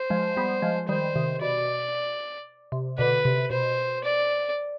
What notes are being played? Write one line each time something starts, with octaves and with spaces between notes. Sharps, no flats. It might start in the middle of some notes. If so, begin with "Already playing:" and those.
Already playing: C5
F3 G#3
G3 B3
F3 G#3
D#3 G3 C5
C3 D#3
B2 D5
C3
B2 D3 B4
C3
B2 C5
D5